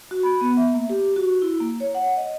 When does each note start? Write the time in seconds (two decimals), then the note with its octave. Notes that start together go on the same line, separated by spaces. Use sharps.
0.11 F#4
0.23 B5
0.41 B3
0.57 E5
0.74 A#3
0.90 G4
1.16 F#4
1.42 E4
1.60 A#3
1.80 C#5
1.95 F#5
2.17 D#5